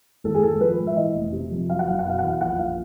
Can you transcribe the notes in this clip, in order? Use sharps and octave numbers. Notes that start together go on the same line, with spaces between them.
G#1 A4
G#4
G#1 A4
F3 B4
G#2
E5
E3 D#5
F1
C3
F2
F#3 F5
F#5
F#1 F5
F#5
B2 F5
E2 F#5
F5
A#1 F#5
A#1 F5